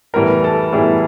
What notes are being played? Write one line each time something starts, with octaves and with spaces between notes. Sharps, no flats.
A2 E3 G3 B3 E4 A#4
A4
A2 E3 G3 B3 E4 G#4